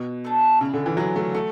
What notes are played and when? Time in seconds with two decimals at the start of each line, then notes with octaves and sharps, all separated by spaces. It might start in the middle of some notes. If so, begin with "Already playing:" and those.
Already playing: B2
0.25 A3 D4 A4
0.61 C#3 E4 G#4 D5
0.74 D3
0.86 E3
0.97 F#3 E4 G#4 D5
1.16 A3
1.34 A3 F#4 A4